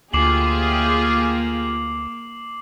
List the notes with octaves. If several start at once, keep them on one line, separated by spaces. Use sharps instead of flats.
D2 A#3 F4 G4 G#4 D6 C7 F#7